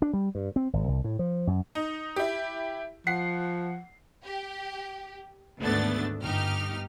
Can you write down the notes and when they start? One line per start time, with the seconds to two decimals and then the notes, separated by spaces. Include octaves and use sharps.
0.02 D4
0.13 G3
0.35 G2
0.56 C4
0.73 G#1
0.88 C2
1.04 A2
1.19 F3
1.47 F#2
1.75 D#4
2.16 E4 G4
3.07 F3 F#5 C7
4.24 G4
5.60 G#1 D2 A3 B3 D4 A6
6.23 G1 D#4 G4 F6